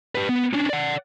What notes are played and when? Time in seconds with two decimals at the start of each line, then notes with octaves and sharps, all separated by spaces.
0.15 G4 B4
0.29 B3
0.53 C#4 D4
0.70 D5 F#5